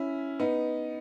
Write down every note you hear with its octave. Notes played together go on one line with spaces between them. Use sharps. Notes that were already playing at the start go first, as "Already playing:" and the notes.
Already playing: C#4 E4
B3 D#4